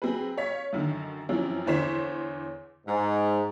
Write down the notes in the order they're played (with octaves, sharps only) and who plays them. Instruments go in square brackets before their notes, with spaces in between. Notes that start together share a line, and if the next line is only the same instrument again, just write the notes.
[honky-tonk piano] F#3 C4 G#4 B4
C#5 F5 B6
F#2 D3 D#3
F#2 E3 F3 C4 C#4
E2 D3 C5 C#5 B6 E7
[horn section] G#2